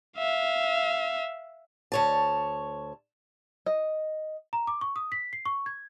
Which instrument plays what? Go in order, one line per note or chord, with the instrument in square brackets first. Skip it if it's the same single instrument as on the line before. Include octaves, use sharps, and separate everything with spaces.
[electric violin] E5 F5
[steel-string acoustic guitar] D2 C#5 A5
[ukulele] D#5
[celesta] A#5
D6
C#6
D#6
B6
C7
C#6
G#6